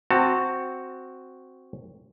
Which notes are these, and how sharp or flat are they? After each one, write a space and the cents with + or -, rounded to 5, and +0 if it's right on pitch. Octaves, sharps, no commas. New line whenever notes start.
C4 +0 F#4 +0 A5 +30